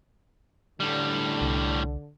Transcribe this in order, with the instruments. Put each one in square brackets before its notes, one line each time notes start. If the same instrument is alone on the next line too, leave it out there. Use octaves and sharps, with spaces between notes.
[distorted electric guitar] A2 G3 [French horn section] D3
[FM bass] C2